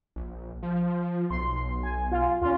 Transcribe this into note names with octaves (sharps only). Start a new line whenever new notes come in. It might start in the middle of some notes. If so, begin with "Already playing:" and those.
A#1
F3
B1 C6
G#5
F4
D#2 C#4 F4